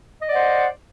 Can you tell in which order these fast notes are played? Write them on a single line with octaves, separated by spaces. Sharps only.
D#5 D5 F#5 C5